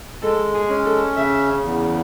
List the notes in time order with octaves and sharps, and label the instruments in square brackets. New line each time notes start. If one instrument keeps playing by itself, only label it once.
[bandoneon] G#3 [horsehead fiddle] A4
[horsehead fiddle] G#4
[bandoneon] C#4
[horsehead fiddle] A4
[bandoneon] C#3 [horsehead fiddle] E5
[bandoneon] E2